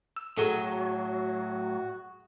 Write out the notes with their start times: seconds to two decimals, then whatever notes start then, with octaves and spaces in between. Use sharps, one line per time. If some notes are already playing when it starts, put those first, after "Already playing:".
0.17 E6
0.37 A2 F#3 F#4 G#4 A4 D#7